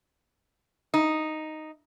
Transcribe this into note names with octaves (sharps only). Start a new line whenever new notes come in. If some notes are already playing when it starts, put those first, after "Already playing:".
D#4